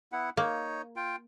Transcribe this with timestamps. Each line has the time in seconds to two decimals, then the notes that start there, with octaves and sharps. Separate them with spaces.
0.12 B3 E4 F#5
0.37 A#3 D#4 C#5
0.96 F4 G5